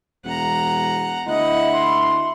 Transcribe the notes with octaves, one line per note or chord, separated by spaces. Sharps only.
E1 F#5 A#5
D2 E4 D#5 F#5
C6